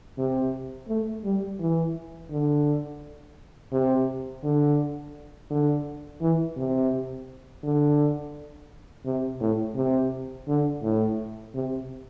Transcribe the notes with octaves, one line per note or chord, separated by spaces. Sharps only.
C3
A3
G3
E3
D3
C3
D3
D3
E3
C3
D3
C3
A2
C3
D3
A2
C3